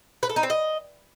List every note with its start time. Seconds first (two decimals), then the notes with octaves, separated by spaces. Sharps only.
0.23 B4
0.29 A4
0.36 D#4
0.43 C4
0.50 D#5